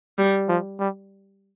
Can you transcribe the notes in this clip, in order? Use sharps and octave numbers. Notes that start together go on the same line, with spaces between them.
G3
F3
G3